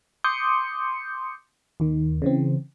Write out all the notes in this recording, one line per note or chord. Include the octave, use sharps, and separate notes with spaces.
C6 D6 D#6 G6 C#7
D#2 D#3
C#3 E3 C4